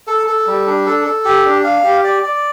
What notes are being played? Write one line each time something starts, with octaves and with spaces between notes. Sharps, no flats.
A4
A4
G3
D4
A4
A4
G4
D4
F5
G4
D5
D5